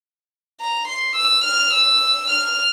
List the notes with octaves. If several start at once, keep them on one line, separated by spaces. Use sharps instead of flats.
A#5
C6
E6
F6
E6
F6